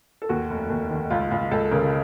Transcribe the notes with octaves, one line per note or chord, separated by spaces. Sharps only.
A4
D#2 F#4
F1
D#2
D#3
C#2 F4
C#2 F4
C#2 A4
C#3 A#4